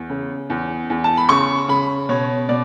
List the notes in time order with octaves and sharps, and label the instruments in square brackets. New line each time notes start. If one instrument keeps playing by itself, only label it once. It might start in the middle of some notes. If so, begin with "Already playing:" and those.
Already playing: [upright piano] E2
C#3
E2
E2
A5
B5
C#3 C#6
C#3 B5
B2 C#5
B2 D5